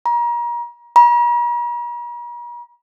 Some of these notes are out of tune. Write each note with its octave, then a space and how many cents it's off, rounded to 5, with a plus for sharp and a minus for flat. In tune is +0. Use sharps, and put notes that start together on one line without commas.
A#5 +35
A#5 +45